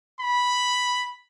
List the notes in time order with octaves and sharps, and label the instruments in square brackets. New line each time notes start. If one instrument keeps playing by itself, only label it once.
[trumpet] B5